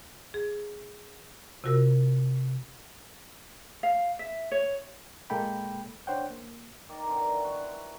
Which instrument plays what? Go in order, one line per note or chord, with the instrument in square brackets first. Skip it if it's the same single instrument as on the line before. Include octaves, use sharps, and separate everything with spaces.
[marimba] G#4
C3 F4 F#4 A#4 E6
[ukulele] F5
E5
C#5
[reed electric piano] A#2 G#3 A#3 A4 G5 B5
D4 C5 C#5 F#5 G5
A#3
[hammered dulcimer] D#3 D5
D3 E3 C4 A#4
B2
E4 F#4
C5